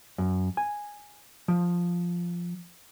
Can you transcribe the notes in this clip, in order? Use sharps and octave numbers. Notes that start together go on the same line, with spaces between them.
F#2
G#5
F3